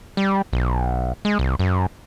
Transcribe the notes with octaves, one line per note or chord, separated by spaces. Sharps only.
G3
B1
G#3
C2
F#2